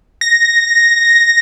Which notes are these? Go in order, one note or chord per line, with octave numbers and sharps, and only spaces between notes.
A#6